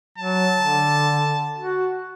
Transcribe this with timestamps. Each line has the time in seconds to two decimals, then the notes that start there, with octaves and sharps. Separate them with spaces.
0.18 F#3 A5
0.58 D3
1.58 F#4